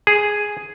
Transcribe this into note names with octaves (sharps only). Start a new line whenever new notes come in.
G#4